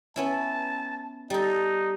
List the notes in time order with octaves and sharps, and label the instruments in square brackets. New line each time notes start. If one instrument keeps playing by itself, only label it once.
[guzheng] B3 C#4 E4 [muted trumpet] A5
[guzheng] G3 A4 [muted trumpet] D#4